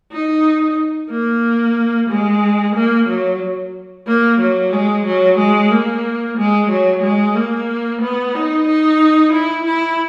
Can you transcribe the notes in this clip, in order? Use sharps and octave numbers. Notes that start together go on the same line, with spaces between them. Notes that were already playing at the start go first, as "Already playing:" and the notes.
D#4
A#3
G#3
A#3
F#3
A#3
F#3
G#3
F#3
G#3
A#3
G#3
F#3
G#3
A#3
B3
D#4
D#4
E4
E4